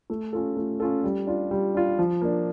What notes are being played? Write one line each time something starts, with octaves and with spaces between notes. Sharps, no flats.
A3
C#4 F4 A4
A3
C#4 F4 A4
G3
D4 F4
G3
D4 F4
F3
A#3 D4